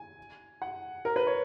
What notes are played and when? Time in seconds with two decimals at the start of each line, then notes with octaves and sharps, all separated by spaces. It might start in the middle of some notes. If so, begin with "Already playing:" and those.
Already playing: G#5
0.62 F#5
1.05 A#4
1.16 B4
1.27 C#5